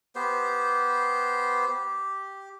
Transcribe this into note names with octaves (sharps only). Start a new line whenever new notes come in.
B3 G4 C5
G4